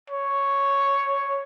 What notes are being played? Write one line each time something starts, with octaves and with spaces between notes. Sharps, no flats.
C#5